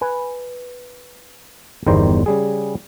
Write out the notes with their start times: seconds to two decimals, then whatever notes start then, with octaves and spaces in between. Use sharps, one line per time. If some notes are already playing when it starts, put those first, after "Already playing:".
0.01 B4 G#5
1.86 G1 E2 D#3 G3 C5 A#5
2.26 C#3 G3 G#4